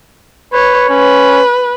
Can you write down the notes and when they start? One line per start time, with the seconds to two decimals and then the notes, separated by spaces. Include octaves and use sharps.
0.53 B4 C#5
0.90 C#4 B4